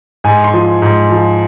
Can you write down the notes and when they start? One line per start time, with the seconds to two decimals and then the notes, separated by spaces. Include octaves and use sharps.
0.24 G#2 G#5
0.44 C6
0.54 F3
0.82 G#2
1.11 F3